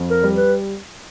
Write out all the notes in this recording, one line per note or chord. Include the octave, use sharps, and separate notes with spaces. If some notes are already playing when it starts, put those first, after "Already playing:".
Already playing: F2
A#4
G3
B4